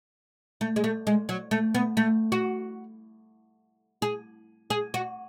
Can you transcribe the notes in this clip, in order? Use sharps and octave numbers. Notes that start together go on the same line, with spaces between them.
A3
G#3
A3
G#3
F#3
A3
B3
A3
F#4
G#4
G#4
F#4